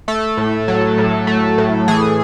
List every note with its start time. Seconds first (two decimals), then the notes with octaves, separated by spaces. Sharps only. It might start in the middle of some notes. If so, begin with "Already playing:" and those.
0.08 A3 A4
0.37 A2
0.68 F#3
0.98 A2
1.27 A3
1.58 A2
1.88 E3 G#4